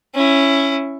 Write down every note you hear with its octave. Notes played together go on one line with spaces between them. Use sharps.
C#4 E4